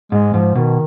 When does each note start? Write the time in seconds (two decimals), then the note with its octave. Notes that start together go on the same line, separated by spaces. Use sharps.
0.12 G#2 G#3
0.34 G#2 F3
0.55 B2 D#3